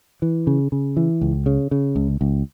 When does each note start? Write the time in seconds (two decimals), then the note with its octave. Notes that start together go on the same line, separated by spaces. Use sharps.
0.22 E3
0.47 C#3
0.72 C#3
0.97 E3
1.21 C#2
1.46 C#3
1.71 C#3
1.96 C#2
2.21 C#2